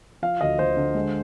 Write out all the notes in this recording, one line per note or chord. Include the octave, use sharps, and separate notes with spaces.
F3 F5
D2 D#5
D2 C5
D3
G#3